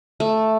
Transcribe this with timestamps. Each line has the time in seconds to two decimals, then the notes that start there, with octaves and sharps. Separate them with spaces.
0.20 A3